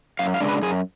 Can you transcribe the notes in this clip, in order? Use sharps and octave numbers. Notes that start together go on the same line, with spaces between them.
F#2 F5
F5
C#3 G#3 D4
B4
F#2 G#4